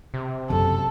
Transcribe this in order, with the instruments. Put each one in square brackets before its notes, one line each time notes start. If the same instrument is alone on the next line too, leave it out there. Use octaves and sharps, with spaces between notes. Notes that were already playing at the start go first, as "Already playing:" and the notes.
[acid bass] C3
[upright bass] F#1 [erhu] A4